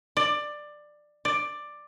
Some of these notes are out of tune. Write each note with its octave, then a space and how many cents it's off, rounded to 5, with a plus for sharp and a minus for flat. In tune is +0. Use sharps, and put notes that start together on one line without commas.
D5 +15
D5 +10